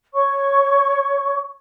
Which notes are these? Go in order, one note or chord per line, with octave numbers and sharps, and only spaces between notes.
C#5 C#6